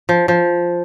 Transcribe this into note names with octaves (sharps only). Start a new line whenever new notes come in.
F3
F3